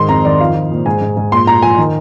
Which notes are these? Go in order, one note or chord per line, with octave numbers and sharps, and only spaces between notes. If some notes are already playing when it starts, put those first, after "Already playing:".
Already playing: G#2 D#3 C6
F2 A#5
D#3 D5
F3 F5
F3
A#2
G#2 G#5
G#2
G#2
A#2 C6
A#2 A#5
F3 G#5
D#3